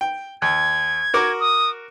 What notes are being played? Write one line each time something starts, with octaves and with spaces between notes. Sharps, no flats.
G5
D#2 G#6
F#4 A#4 D6
D#6